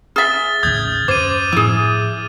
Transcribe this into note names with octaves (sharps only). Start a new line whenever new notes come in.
G#4 E5 F6 A6 G7
A1 D#2 C#3 D#6 G6 G#6
F#2 C#4 C5 D6 G#6 D#7
A2 F3 E4 G#4